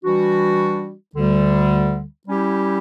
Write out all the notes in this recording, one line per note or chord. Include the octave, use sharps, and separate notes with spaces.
E3 G3 D4 F#4
D2 D3 G3
G3 C#4 E4 G4